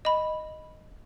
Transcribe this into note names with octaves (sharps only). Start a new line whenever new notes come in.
D#5 B5